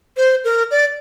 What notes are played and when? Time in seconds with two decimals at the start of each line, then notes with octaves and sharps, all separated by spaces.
0.17 C5
0.44 A#4
0.71 D5